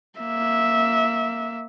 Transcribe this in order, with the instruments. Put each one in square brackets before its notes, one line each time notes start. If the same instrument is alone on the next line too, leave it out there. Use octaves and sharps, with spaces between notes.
[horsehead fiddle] A#3 E5